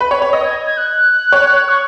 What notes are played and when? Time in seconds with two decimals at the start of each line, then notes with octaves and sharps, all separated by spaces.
0.01 B4
0.11 C#5
0.22 C#5
0.33 D#5
0.44 G#6
0.66 G#6
0.77 F#6
1.32 C#5
1.69 C#6